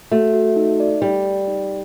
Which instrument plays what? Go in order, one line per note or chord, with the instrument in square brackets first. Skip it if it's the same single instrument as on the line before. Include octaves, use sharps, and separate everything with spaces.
[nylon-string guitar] A3 [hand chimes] F#4
[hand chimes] F#4
D#4
D5
[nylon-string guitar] G3 [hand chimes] D5
[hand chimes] D5
D#4